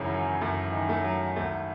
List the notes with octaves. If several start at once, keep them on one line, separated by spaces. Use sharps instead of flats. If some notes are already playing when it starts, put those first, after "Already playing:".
Already playing: G#1 F#2 C#3 E3 C#4 E4
F#3
F#2 A3
D#3
A3
F#3
G#1 A3